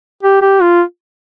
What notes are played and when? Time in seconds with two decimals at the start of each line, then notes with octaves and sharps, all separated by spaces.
0.23 G4
0.42 G4
0.61 F4